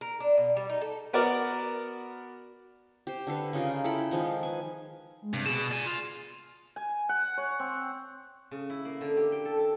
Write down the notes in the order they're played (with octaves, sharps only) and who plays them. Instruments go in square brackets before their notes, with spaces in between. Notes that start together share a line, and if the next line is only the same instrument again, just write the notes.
[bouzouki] A#4
D4
B2
G3
D#4
A4
[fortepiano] B3 F#4 A#4 D5 F6
[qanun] G4 C5
D3 A4 B4
C#3 D#4 F4 A#4
E4 A4 G5 B5
D#3 F3 G#3
B4 G#5
[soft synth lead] G#3
[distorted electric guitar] G2 [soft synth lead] C3
[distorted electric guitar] B2 [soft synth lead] G#4 [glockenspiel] E7
[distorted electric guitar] D5 G#5
F4
[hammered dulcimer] G#5
F#5
C#5
C4
[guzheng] C#3
E4
A#3
D3
G4
G5
A4
A4